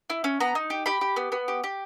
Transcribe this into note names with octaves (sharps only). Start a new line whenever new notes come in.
E4
C#4
B3 A#5
D#4
G4
G4 B5
G4
B3
B3
G4
G4